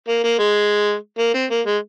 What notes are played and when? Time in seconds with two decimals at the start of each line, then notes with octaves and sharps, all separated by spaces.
0.08 A#3
0.24 A#3
0.39 G#3
1.18 A#3
1.34 C4
1.50 A#3
1.66 G#3